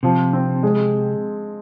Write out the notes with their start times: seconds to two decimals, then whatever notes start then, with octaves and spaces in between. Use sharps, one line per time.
0.03 C3 F3
0.33 C4
0.63 G#3